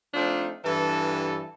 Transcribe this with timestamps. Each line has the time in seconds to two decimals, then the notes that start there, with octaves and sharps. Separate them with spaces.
0.14 F3 A3 C4 D4 D#4 F4
0.65 G2 E3 A4